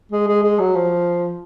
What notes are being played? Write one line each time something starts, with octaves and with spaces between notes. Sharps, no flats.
G#3
G#3
G#3
F#3
F3